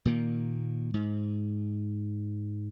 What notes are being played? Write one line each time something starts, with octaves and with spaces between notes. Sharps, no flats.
A#2 D#3 A#3
G#2